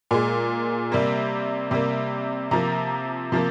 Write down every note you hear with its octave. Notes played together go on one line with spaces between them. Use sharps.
A#2 G#3
C3 G3 A#3
C3 G3 A#3
C3 F3 A#3 A#5
C3 F3 A#3